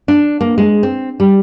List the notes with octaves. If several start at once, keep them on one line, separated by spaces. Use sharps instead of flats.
D4
A#3
G#3
C4
G3